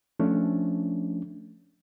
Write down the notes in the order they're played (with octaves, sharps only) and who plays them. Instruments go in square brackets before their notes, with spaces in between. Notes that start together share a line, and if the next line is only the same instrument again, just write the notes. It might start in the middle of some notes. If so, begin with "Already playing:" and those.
[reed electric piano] F3 A3 C#4 D4